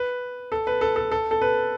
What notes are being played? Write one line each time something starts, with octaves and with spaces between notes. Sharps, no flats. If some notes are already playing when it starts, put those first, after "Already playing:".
Already playing: B4
A4
B4
A4
A4
A4
A4
B4